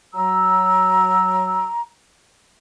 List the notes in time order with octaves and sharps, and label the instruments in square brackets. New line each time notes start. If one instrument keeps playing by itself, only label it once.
[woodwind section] F#3 E6 [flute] A#5